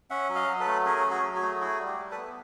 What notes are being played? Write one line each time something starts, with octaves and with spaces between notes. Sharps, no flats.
C#4 E5 F#5
F#3
D#5 F5
F#3
A4 B4
A3
C#4 G#4 A#4
F#3
F#4 G#4
F#3
F#4 G#4
A3
E4 F#4 G#4
G3
G4
G3
A4 B4
B3